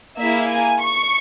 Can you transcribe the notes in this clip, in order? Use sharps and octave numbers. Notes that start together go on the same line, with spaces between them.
A#3 E4 G#4 E5
G#5
C#6